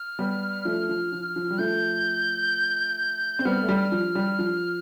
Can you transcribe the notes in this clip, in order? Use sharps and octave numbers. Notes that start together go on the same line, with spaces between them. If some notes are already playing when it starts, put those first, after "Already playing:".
Already playing: F6
G3 B3
F3 A3
F3
F3
F3
G3
F3 A3 G6
C4
G3 B3 F6
A3
G3
F3
G3
F3